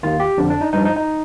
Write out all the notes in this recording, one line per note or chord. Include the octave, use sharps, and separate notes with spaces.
D#2 D#3 F4
G4
F2 D3 F3 D4
D4
D#4
G2 F3 D#4
D#4
D#4